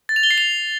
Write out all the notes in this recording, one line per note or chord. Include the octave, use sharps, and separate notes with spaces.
A6
F7
G7
C7
F7